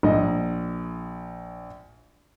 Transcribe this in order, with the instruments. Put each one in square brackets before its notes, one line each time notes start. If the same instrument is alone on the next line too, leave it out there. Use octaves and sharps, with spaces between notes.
[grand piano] A#1 D#5